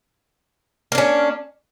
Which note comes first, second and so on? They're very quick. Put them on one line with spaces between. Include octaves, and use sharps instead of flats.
A#3 D4 C#4